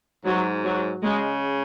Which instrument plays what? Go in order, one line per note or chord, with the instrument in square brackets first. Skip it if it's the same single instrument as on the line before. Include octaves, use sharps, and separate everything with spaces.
[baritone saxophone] G#2 [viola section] F#3
[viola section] F#3
[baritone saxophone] C#3 [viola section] G#3